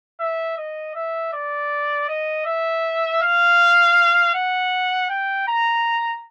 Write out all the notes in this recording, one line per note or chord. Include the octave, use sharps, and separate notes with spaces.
E5
D#5
E5
D5
D#5
E5
F5
F#5
G5
A#5